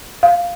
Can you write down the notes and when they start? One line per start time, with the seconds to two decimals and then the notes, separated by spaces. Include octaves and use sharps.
0.23 F5